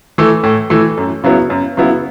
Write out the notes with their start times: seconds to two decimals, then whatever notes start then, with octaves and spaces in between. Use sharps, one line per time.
0.18 E3 A3
0.43 A2
0.70 E3 A3
0.97 F#2
1.24 C#3 F#3 B3 E4
1.50 F#2
1.77 C#3 F#3 B3 E4